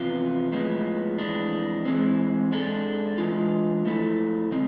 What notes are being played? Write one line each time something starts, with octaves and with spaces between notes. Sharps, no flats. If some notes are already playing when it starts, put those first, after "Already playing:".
Already playing: E2 C3 F3 B3 F4
A2 F3 G#3 B3
F2 E3 G#3 D4
E3 G#3 C4
G#2 G#3 D4 A4
E3 G#3 D4 F4
F3 A3 E4 A4
D3 G#3 C4